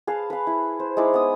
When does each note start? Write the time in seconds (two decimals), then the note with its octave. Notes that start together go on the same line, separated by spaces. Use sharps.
0.07 G#4 B4 F5 A5
0.30 B4 F5
0.47 E4
0.80 C5
0.97 G#3 D#4 E4 D5
1.14 B3 D#6